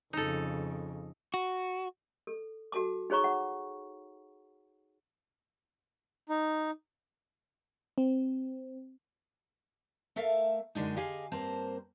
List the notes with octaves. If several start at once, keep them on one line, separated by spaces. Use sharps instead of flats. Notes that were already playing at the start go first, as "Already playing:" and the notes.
F2 C#3 D#4 A4
F#4
A4
F#4 A4 A5 D6
D#4 G#4 C#5 A#5 C#6
F#5
D#4
C4
A3 A4 A#4 E5 F5
F#2 D3 G#3 D4 D#4
G4 G#4 D#5 F5 G#5
G2 A#3 C4 A#4 C5 A5